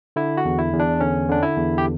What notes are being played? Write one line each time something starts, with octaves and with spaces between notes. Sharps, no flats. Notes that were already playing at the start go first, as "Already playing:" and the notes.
D3 E4
F#4
E2
E4
E2
D4
D3 C#4
D3 D4
E4
E2
G4